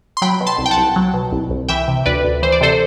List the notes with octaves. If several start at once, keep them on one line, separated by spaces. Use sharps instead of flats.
C6
F#3 G5 B5
B2
A5 C6
C2
G5
F#5 A5
C2
F#3
B2
C2
C2
E3 E5 G5
C3
D2 B4 D5
D2
E3 C5
D5
C3 A4 C5